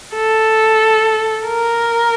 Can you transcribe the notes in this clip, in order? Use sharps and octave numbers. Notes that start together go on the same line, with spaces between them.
A4
A#4